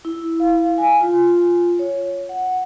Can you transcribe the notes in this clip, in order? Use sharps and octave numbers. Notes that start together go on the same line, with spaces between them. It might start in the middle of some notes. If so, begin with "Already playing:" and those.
E4
F5
G#5
F4
C#5
F#5